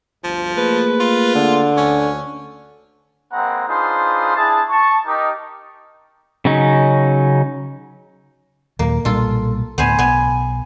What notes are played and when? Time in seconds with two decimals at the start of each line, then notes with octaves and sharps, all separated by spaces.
0.24 G1 D2 F3
0.57 A3 A#3 G#4 B4
1.00 F4
1.35 D3
1.77 D2 C#4
3.32 G#3 A#3 C4 B4 F#5 A#5
3.67 D4 D#4 F4 G#4 B4 C5
4.35 D4 E4 G#4 A5
4.69 A5 C#6
5.06 D#4 G4 A#4
6.45 C#3 F#3 C#4 D#4
8.79 D#2 A#2 F#3 A#3
9.05 B1 A#2 G3 F4 A4
9.78 D2 A2 B3 C5 G#5
9.99 B1 B3 G#5